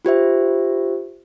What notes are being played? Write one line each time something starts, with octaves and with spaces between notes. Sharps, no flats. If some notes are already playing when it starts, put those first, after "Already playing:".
F4 G4 C5 E5